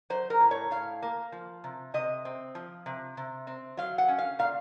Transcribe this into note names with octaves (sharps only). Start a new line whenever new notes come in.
F#3 C5
A#4
A2
C#5
A2 F5
A#3
F3
C3
C3 D#5
C4
F3
C3
C3
C4
F#3 F5
F#5
C#4
F5
A#2 F5